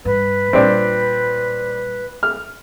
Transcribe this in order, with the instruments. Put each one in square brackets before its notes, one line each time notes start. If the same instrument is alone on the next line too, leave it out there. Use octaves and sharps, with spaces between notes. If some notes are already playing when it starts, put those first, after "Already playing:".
[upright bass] G2 [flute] B4
[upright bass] A#2 G3 [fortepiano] C4 D4
[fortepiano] F6